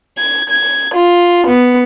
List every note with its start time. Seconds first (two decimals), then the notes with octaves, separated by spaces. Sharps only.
0.17 G#6
0.49 G#6
0.94 F4
1.47 B3